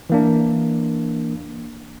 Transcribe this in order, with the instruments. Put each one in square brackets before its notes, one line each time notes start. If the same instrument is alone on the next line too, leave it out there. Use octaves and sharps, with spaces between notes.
[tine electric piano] E3 A#3 D4